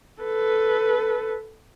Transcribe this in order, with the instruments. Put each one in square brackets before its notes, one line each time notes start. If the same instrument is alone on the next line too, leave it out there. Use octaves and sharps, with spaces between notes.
[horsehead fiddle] A4 B4